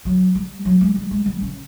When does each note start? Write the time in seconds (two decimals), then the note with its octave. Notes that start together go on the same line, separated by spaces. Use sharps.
0.05 F#3
0.35 G3
0.65 F#3
0.81 G#3
0.96 G3
1.11 G#3
1.26 G3
1.41 C#3